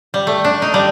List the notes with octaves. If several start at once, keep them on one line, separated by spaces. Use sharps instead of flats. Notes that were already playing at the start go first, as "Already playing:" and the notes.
G3
A3
D4
D#4
G3